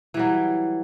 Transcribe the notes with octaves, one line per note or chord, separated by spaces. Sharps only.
E3 F#3 G3